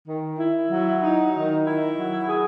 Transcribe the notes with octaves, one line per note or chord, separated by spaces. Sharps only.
D#3
E4
F#3
D#4
D#3
E4
F#3
G#4